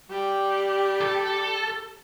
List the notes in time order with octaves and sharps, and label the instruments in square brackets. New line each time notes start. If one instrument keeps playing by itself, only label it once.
[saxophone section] G3 [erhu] G4
[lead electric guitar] A4